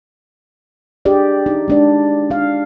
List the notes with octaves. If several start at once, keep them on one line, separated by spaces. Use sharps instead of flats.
D4 G4 G#4 D5 D#5
D#4
G#3 D4 D5
D4 F5